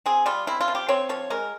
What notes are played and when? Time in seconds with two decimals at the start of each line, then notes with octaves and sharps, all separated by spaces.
0.06 C4 G#4
0.26 G3 F4
0.47 C4 E4
0.61 F4
0.68 F3
0.75 G4
0.89 C4 C#5
1.09 F3 C#5
1.30 G#3 A#4